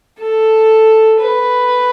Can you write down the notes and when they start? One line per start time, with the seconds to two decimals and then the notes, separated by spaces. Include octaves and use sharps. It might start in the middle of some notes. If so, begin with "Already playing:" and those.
0.20 A4
1.21 B4